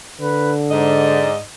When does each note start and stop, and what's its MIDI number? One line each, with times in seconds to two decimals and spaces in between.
0.21 1.30 50
0.21 0.52 71
0.71 1.39 44
0.71 1.39 74
0.71 1.39 75